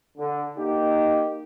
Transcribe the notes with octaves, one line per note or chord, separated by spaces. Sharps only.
D3
A#3 D#4 G4